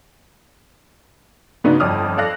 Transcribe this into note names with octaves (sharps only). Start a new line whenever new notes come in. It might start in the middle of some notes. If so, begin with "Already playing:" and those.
G#2 C#3 B3 D4 D#4 F#4
G1 F2 D5 D#6 F6
F2 A4 D5 F5 F#6 A#6